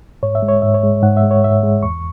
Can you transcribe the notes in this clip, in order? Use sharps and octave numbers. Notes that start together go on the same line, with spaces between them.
G#2 C#5
E5
G#3
C#5
G#2 E5
C#5
G#3
G#2 F#5
E5
G#3
C#5
G#2 E5
G#3
E2 C#6